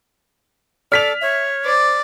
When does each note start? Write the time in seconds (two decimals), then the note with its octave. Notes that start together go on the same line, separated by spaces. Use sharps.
0.92 A4 D5 F6 B6 F7
1.22 C#5 E5
1.65 C5 D5